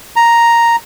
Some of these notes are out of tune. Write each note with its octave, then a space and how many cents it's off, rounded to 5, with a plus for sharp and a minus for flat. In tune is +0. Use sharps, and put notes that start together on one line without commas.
A#5 +0